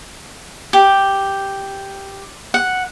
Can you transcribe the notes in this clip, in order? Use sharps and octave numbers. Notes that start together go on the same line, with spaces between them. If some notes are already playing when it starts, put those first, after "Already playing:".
G4
F#5